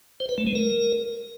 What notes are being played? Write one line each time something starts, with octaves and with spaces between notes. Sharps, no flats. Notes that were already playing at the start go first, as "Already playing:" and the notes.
C5
B4
A3
G#3
A#4